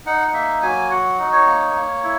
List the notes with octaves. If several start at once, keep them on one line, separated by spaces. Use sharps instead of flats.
D#4 F#5
F#5
A#3 E5
F#3 G#5
F#4 F#5
D#4
C#5
A#3
A#3
E4